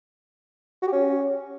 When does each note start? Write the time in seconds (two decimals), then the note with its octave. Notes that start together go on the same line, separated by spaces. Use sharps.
0.82 F#4
0.87 G4
0.93 C#4